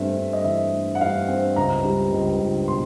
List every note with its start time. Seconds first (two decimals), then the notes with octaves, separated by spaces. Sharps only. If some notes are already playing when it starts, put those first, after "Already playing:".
Already playing: G2 A3 C4 E5
0.16 G2
0.33 D#5
0.44 E3 E5
0.72 A3
0.95 F#5
1.01 G2 F5
1.28 C4
1.56 C#2 A#5
1.84 G3
2.12 C#2
2.41 C#2
2.68 B2 C6